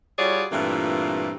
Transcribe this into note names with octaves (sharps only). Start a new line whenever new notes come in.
G3 F4 F#4 G#4 C#5 D5
G2 A#2 E3 A3 C4 F4